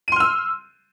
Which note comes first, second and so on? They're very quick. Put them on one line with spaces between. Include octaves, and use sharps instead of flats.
D#7 C6 F6 E6